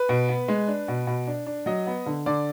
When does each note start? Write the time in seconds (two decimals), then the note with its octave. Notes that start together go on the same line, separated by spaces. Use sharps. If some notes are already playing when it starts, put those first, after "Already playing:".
Already playing: B4
0.09 B2
0.29 B3
0.48 G#3
0.68 D4
0.88 B2
1.07 B2
1.27 D4
1.46 D4
1.66 F#3 D#5
1.87 B3
2.06 D3
2.26 D3 D5